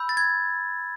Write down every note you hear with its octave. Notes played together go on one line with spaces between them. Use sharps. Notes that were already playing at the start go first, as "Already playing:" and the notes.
Already playing: B5 E6 G6
A6
G#6